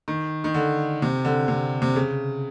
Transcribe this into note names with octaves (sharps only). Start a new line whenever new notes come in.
D#3
D#3
D3
C3
D3
C3
C3
C#3